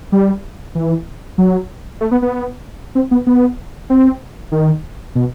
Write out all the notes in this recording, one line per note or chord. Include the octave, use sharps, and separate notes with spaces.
G3
E3
F#3
A3
B3
B3
C4
B3
B3
C4
D#3
B2